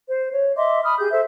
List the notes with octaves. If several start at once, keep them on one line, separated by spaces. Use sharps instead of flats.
C5
C#5
D#5 E5 C6 D6
B5 D#6 F6
G4 G#4 G6
A4 C5 E5